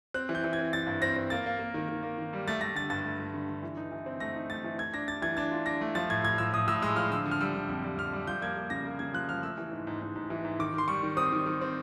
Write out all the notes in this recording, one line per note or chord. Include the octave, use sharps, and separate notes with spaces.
C4 F#6
E3
G6
E3
G#6
C4
E3 A6
G2
C4 A#6
C4
A#3 A6
A#3
A#3
D#3
D#3
A#3
D#3
G3
A3 A6
A3 A#6
D3 A6
G2 A6
A3
A3
D3
D3
E3
D#4
E3
C4
A3 A#6
D#4
A3 A6
E3
A3 G#6
D4 A#6
D4 A6
E3 G#6
D4 A6
F4
D4 A#6
A3
F3 A6
A2 G#6
A2 G#6
F3 E6
A2 D#6
A2 E6
G#3 E6
F3 F6
D3 E6
D3
F6
G3 E6
D3
F2
G3
F2 F6
G3
F3 G6
A#3 G#6
A#3
C#3 A#6
A#3
C#3 G#6
F3 F#6
F3 F6
A3 E6
E3
G#2
G#2
G#2
G#2
E3
G#2
D#3 D6
D#3 C6
G3 C#6
D#3
C4 D#6
D#3
D#3
C4